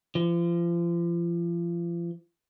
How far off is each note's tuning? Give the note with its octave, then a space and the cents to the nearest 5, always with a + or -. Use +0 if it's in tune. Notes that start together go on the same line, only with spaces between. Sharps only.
F3 -35